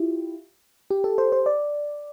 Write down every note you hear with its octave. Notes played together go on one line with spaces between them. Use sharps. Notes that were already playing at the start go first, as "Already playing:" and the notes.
Already playing: E4 F4 G4
G4
A4
C5
C5
D5